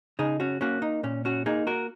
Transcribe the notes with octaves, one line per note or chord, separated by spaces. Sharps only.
C#3 D#4 G#4
C#4 F#4
A#3 C#4 F#4
D#4
A#2 C#4
C#4 F#4
A#3 D#4 G#4
F#4 A#4